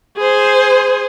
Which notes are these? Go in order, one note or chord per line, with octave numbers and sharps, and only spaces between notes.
G#4 C5